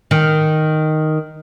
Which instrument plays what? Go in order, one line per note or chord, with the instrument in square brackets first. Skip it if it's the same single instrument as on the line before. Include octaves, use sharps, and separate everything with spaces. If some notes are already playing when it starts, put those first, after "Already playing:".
[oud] D#3